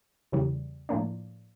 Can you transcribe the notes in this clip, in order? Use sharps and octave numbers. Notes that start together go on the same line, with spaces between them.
E2 C#3 E3 G3
A2 F3 A#3 D4